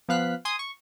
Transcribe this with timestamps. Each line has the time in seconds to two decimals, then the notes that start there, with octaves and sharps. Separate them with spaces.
0.09 F3 B3 F5 F#6 B6
0.45 G#5 C6 D#6
0.59 C#6